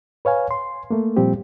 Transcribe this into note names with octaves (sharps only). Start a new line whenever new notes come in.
B4 C#5 F5 G#5
C6
A3 A#3
A#2 F3 G3 C4 G4